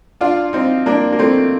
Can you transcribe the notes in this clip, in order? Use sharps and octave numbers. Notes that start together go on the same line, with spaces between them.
D4 F4
C4 D#4
A#3 D4
A#3
A3 C4